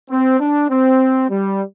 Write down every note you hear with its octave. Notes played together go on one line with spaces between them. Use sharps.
C4
D4
C4
G3